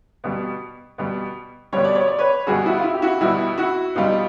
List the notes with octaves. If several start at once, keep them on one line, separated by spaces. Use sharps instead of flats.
B2 G3
B2 G3
B2 G3 C#5
D5
C#5
D5
B4 C#5
B2 G3 F#4 G#4
E4 F#4
F4
E4
G4
E4 F#4
B2 G3 E4 F#4
E4 F#4
B2 G3 D#4 F4